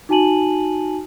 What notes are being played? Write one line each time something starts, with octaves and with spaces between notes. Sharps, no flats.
D#4 F#4 G#5 A5 D#7 F#7